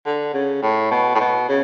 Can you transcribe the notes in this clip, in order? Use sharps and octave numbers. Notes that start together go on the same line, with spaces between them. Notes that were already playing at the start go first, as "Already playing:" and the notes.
D3
C#3
A2
B2
A2
B2
C#3